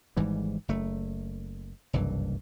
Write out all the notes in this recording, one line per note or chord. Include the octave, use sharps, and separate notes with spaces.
G#1 G#2 E3 G3
F#1 A3
F#1 C2 G2 E3